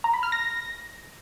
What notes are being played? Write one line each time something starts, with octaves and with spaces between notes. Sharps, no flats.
A#5
B5
F6
A#6